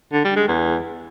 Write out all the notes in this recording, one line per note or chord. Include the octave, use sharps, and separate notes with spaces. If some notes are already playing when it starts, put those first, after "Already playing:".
D3
G3
G#3
E2